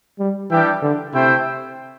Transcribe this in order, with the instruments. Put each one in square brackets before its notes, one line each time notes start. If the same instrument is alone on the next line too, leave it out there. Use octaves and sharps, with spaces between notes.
[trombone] G3
[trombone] E3 [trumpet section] G3 D4 G4 E5 G5
[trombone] D3
[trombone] C3 [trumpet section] A3 E4 C5 E5 G5